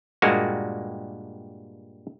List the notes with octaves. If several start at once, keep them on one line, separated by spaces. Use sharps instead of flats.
G2 A#2 G3 G#3 A#3 F#4